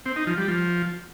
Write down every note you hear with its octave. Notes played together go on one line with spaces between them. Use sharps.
C4
D#4
F3
G3
F3